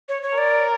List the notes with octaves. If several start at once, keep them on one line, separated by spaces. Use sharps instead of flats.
C#5
C#5
A#4 D5